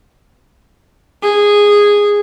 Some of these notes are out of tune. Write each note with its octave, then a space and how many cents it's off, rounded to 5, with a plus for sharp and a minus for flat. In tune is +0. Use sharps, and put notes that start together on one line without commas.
G#4 -10